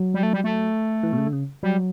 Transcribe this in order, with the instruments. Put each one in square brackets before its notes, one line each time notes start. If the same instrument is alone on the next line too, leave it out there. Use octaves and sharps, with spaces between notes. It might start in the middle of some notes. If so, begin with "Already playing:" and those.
Already playing: [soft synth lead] F#3
[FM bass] G3
A3
G3
A3
[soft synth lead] E3
B2
C#3
D3
C#3
[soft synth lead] F#3 [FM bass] G3